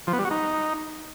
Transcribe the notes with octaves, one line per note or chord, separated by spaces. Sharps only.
F3
B3
G3
F#4
D#4